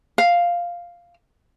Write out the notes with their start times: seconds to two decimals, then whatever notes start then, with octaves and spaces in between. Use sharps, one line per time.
0.18 F5